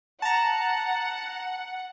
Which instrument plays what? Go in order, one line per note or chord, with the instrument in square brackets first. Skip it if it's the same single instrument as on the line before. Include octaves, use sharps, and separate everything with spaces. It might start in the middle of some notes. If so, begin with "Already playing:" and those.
[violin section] F#5 [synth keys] A5 A#5